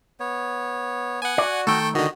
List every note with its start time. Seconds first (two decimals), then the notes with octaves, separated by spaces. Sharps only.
0.20 B3 C#5
1.22 B3 F#5 G#5
1.38 F#4 D5
1.67 D#3 A3 A4 G5
1.95 D3 D#3 F#4 D#5